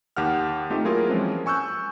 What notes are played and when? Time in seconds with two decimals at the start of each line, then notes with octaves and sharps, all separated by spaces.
0.17 D#2 G4 F#5 F6
0.70 A3 C4 D#4 F4 G4
0.84 F#3 A#3 E4 F4 G#4 A#4
1.09 E3 F3 G#3 C4 C#4 F4
1.46 G#5 C#6 E6 F#6 G6